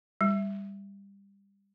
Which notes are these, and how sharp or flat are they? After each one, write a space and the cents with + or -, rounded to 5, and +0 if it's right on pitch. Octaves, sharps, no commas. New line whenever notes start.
G3 +20